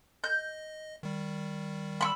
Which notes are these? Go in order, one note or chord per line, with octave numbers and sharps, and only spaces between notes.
D#5 G6
D#3 G3
B5 C#6 E6